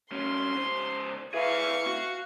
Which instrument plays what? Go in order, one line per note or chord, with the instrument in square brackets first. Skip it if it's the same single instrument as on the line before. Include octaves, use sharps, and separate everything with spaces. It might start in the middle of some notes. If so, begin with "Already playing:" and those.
[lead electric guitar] G2 C#4 [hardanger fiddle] C6
[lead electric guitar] C#2 C5
[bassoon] E3 [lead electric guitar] G#4 B4 [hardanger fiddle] F5 C#6
[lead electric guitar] F#4